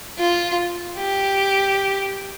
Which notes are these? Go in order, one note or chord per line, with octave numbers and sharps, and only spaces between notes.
F4
G4